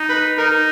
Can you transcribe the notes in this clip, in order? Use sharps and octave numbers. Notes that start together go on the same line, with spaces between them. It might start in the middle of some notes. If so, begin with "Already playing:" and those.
Already playing: D#4
B4
D#4 A#4